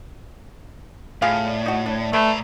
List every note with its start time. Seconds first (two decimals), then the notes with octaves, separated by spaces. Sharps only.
1.22 A2 F4 G#4 F5
1.45 D5
1.66 D#4 F#4
1.86 D4 C#5
1.99 D5
2.13 A2 A3 B4 A#5